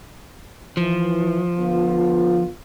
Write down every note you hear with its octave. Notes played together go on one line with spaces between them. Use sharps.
E3 F3
D3 B3 F4